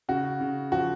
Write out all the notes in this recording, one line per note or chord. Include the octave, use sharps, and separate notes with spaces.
C#3 F#4
C#3
F3 F#4